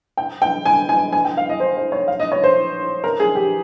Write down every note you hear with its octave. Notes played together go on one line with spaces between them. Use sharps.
G5
G5
G#5
G#5
G#5
G5
F5
D#5
C5
C5
C#5
F5
D#5
C#5
C5
A#4
G#4
G4